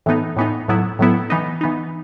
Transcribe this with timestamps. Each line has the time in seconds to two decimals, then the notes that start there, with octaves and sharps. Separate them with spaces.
0.06 A2 E3 B3 D#4
0.36 A2 E3 B3 D#4
0.68 A2 F#3 B3 E4
0.99 A2 F#3 B3 E4
1.30 E3 B3 D#4
1.61 E3 B3 D#4